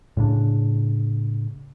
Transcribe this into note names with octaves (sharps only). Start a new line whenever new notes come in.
A2 C#3 D4